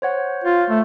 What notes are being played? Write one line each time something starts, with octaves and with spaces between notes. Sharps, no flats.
C5 C#5 F#5
F4
A3